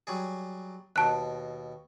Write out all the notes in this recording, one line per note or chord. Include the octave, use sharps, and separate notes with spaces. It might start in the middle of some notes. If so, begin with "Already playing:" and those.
F#3 G3 G#4
D#2 B2 A5 F#6